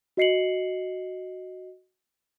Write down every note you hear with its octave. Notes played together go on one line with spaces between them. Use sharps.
F#4 D#5 C7 C#7 F#7